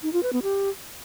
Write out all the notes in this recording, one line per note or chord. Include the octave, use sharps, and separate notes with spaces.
D#4
F4
B4
B3
G4